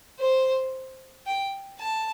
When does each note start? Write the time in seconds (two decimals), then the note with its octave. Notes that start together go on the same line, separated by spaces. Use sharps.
0.20 C5
1.27 G5
1.79 A5